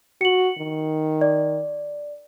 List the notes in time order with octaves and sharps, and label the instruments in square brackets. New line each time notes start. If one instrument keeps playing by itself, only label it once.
[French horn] F#4 [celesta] C#7 F#7
[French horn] D#3
[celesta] D5